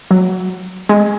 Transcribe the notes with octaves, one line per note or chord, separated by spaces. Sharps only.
F#3
G#3